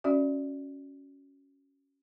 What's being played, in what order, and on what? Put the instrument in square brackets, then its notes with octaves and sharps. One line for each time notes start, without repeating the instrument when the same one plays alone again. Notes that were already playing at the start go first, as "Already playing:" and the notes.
[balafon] C#4 F#4 D5 E5